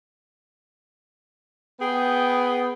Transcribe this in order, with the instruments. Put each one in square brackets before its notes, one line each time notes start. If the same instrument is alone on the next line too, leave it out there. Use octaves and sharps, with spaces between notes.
[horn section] B3 G#4 G5